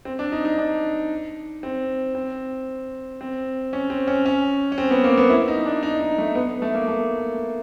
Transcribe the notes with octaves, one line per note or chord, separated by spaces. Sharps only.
C4
D4
D#4
D#4
D4
C4
C4
C4
C#4
C4
C#4
C#4
C#4
C4
B3
A#3
B3
E4
D#4
D4
D#4
D#4
A3
B3
A3
A#3
A3